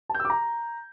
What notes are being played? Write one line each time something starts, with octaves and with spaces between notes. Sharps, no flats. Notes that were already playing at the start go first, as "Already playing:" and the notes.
A5
G6
E6
D6
A#5